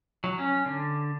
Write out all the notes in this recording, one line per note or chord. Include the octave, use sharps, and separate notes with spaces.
F#3
C#4
D3